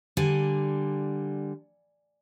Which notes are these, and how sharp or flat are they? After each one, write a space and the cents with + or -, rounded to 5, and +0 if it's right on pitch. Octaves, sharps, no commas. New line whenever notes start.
D3 +10 G3 +0 G#5 +0